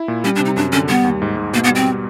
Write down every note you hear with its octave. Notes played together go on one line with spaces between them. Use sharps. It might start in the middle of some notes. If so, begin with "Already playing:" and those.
Already playing: E4
A#2
G3 C#4
D4
C3
D#4
F#2 D4
D3 C#4
G3 B3
D#2
G#2
G#2
B2 A#3
B3
G3
C4